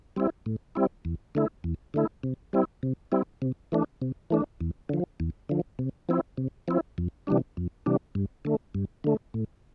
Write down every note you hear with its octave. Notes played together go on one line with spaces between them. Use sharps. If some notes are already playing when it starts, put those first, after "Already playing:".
G3 C4 E4
A2
G3 C4 E4
E2
D3 A3 E4
E2
D3 A3 E4
C3
G3 C4 E4
C3
G3 C4 E4
C3
E3 A3 D4
C3
E3 A3 D4
E2
D3 F3
E2
D3 F3
C3
F3 C4 E4
C3
F3 C4 E4
F2
C3 E3 G3 D4
F2
C3 E3 G3 D4
G2
D3 A3
G2
D3 A3
A2